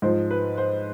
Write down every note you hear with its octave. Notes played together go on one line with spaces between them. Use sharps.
G#2 F3 C5
B4
C5